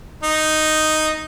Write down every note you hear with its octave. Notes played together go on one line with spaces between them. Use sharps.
D#4